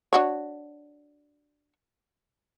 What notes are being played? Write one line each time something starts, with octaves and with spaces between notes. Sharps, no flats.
D4 F#4 C#5